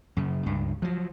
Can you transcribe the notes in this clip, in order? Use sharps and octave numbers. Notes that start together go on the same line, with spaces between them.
F#2 C#3
C#2 G2
F3 F#3